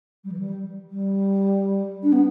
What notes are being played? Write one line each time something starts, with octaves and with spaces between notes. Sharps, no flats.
G3
E3
G3
G3
D4
B3